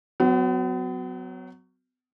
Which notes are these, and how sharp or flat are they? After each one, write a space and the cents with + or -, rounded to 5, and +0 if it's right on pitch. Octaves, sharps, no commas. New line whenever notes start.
F#3 +0 B3 +40